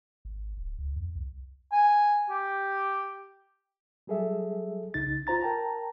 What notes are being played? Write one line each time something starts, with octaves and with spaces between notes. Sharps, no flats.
G#1
D1
C#2
F2
C2
G#5
G4
F#3 G3 G#4 A4 E5
C2 C#3 D#4 A6
F4 C5 A#5 A6
A#4 G5 A5 A#5